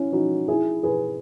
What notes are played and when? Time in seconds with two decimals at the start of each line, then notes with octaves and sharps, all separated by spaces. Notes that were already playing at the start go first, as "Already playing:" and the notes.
Already playing: C#4 E4
0.12 D#4 F#4
0.48 E4 G#4
0.83 G#4 B4